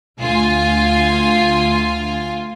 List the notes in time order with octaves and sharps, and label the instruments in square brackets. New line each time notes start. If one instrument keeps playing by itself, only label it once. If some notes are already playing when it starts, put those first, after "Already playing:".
[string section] D2 F4 G#5